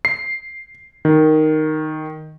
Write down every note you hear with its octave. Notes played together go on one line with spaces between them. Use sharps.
C7
D#3